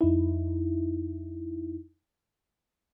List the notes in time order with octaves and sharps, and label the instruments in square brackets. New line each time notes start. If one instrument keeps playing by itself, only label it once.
[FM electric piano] F2 D#4 E4